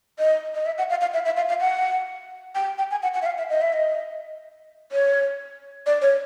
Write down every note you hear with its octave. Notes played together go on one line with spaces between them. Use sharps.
D#5
D#5
E5
F#5
F5
F5
E5
E5
F5
F5
F#5
G5
G5
G#5
F#5
F#5
E5
F5
E5
D#5
E5
D#5
C#5
D5
C#5